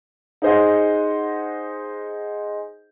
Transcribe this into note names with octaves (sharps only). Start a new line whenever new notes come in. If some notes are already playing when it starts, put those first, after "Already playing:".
D#4 G#4 C5 D#5 F#5